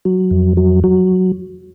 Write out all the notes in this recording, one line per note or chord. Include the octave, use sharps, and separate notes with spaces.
F#3
F2
F#3
F#3